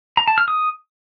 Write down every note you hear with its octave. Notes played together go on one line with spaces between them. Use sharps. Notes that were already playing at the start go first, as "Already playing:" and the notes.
A#5
A5
F6
D#6